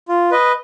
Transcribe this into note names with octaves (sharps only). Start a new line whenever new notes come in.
F4
B4 D#5